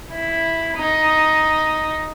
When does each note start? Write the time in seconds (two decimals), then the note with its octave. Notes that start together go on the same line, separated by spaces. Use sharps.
0.11 E4
0.77 D#4